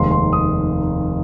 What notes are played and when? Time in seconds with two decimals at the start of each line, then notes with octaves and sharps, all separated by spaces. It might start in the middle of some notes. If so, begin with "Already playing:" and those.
Already playing: F1 D#2 D#3 G#3 C4 C6
0.11 C6
0.33 D#6